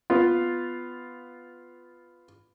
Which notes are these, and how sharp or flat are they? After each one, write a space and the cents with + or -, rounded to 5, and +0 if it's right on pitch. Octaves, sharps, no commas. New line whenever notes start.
B3 +10 F4 +0